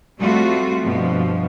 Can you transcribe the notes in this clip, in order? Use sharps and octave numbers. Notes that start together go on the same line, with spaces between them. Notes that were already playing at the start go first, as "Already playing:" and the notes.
G3 A3 C4 F4 F#4
G2 B2 F3